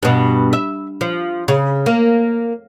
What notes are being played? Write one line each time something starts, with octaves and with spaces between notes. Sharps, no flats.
G2 B2
E5
F3
C#3
A#3